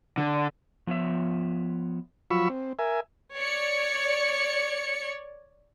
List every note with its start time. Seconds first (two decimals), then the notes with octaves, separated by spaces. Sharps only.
0.18 D3
0.87 F3 B3 F4 C#5 E5
2.31 F3 F#3 F4 B5 C#6 E6
2.50 C4
2.79 A#4 E5 G#5
3.36 C#5 D5 C#7